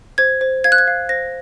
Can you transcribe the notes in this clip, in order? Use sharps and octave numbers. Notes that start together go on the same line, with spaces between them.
C5 G#6
C5
F5 G#6
F#6
G#6
F5
C5 A#6